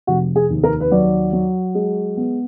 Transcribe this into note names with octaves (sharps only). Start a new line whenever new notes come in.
F1 F#4
G#4
D#2
A#4
B4
F#3 D5
F#3
G#3
B3